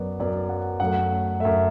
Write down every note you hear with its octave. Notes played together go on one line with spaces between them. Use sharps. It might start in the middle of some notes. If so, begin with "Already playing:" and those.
Already playing: F#2 F#3 B3 D5
F#2 F#3 B3 D5
F#5
F#2 F#3 A3 F#5
F#2 F#3 A3 E5